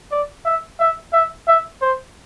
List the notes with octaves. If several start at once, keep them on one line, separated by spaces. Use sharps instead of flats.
D5
E5
E5
E5
E5
C5